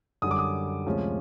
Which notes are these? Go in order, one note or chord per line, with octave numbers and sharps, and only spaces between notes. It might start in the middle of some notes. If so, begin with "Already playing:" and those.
F#2 D3 G3 D#6
D6
D#6
D2 C3 F3 G#3 C#4